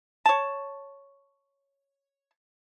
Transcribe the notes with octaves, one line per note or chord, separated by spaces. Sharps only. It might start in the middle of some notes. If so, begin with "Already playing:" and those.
C#5 A5